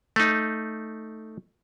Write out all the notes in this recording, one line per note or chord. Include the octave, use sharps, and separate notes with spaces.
A3 D#4